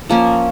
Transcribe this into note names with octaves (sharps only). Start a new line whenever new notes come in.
F3 A#3 C#4